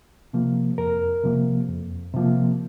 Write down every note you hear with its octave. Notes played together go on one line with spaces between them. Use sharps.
C3 F3 A#3
F2 A#4
C3 F3 A#3
F2
C3 F3 A#3